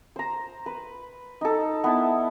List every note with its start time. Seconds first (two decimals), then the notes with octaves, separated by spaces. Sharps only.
0.16 C5 A#5
0.66 B4
1.41 D#4 A4
1.84 B3 E4 A5